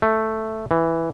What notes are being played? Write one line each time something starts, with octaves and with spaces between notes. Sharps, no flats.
A3
E3